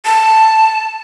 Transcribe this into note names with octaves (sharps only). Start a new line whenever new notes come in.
A5